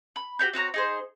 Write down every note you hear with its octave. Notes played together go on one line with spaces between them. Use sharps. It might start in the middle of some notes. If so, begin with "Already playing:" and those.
B5
F#4 G4 C#5 G6
C4 F#4 C#5 A#5
D#4 G#4 C5